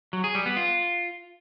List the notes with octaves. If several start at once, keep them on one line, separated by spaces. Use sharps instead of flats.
F#3
G#4
G3
B3
F4